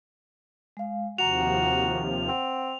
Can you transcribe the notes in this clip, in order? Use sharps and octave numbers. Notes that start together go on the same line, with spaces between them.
G#3 F5
D#2 C3 F3 F#4 F#5 A#5 F7
C4 F#5